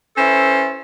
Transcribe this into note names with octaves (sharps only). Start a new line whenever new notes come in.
C#4 E4 A4 B4 C5